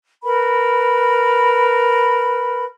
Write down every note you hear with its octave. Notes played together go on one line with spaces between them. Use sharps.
A#4 B4 B5